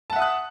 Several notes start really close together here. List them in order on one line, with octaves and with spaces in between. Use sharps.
A5 F#5 E5 D#6 F#6